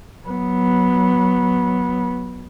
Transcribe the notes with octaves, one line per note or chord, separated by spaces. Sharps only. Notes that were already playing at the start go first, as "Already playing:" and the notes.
F#3 B3